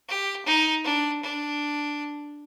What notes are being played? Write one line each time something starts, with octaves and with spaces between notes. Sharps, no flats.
G4
D#4
D4
D4